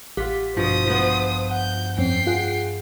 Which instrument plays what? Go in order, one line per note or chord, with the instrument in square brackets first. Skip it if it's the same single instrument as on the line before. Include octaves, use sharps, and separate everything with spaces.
[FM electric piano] A1 B6 [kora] F4 F#5 [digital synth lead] G4
[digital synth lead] G2 [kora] B2 F3 [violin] C5 D#6
[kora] F3 B3
[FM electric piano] F#5 [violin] G6
[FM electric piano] F2 C4 C#4 [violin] G5 C7
[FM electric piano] F4 G#4 F#5